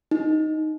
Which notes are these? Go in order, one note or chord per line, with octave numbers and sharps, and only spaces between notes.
D#4